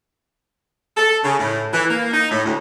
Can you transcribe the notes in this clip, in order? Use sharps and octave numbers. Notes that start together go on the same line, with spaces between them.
A4
C#3
A2
E3
A#3
D#4
A2
D2